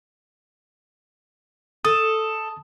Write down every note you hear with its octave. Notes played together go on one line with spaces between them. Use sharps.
A4 D#6